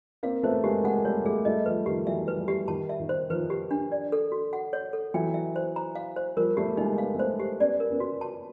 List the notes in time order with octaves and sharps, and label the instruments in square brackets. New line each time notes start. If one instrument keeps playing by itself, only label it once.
[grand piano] A#3 C4 [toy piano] F5
[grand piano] A3 B3 [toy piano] C5
[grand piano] G#3 A#3 [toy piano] G4
[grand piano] G#3 A#3 [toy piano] F#5
[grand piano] G3 A3 [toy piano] C#5
[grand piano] G3 A3 [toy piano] G#4
[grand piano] G3 A3 [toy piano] D#5
[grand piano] F3 G3 [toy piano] B4
[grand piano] D#3 F3 [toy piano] G4
[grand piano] E3 F#3 [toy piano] E5
[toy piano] B4
[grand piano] F3 G3
[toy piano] G4
[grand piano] D#3 [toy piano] A5
[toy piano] E5
[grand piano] D#3
[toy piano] C5
[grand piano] D#3 F3 [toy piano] B4
[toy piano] G4
D4
D5
A4
F#4
F#5
C#5
A4
[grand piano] E3 F#3 [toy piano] G5
[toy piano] E5
C5
A#5
F5
C5
[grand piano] F3 G3 [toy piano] A#4
[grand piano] G3 A3 [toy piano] G4
[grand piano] G#3 A#3 [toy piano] D#4
[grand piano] B3 [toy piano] F5
[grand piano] A#3
[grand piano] A3 B3 [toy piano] C5
[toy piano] G4
[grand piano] B3 C#4 [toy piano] D5
[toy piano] A#4
[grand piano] B3 C#4
[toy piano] F#4
A5